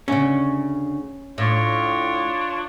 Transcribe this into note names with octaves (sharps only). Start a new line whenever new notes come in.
D2 C#3 C#4
A2 D4 F4 C#5